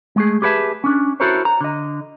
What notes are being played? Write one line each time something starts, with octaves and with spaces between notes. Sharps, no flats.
G#3 A3 G#4
G4 G#4 B4 C#5 E5 A5
C#4 D4
E4 F#4 A4 A#4 C5 C#5
A#5
D3 D#5